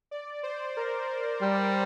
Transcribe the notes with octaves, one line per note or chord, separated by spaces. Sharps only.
D5
C5
A#4
G3